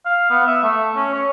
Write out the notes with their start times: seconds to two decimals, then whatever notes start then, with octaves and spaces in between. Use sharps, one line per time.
0.06 F5
0.30 B3
0.47 E5
0.64 A3
0.96 C#4
1.14 C#5